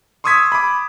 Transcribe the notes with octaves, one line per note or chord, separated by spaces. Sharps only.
C6 C#6 D#6 E6 G#6 B6
B5 D6